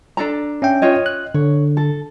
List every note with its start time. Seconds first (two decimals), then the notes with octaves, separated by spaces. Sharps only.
0.17 D4 A4 A#5
0.62 C#4 E5 G5
0.82 F4 C#5 D#5
1.06 F#6
1.35 D3 C#5
1.77 A4